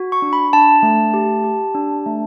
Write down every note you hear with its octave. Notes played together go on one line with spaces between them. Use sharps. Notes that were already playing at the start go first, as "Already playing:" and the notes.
Already playing: F#4
C#6
D4
B5
D4 A5
A3
G4
G4
D4
A3